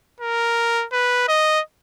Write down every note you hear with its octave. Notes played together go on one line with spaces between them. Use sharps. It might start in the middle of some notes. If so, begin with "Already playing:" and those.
A#4
B4
D#5